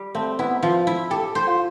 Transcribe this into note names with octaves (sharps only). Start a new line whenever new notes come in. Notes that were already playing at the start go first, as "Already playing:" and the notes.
Already playing: G3
A3 C4
B3 E4
F3 F4
E4
G4 A4
C5
F4